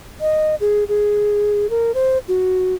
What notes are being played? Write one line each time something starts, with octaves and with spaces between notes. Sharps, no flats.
D#5
G#4
G#4
A#4
C5
F#4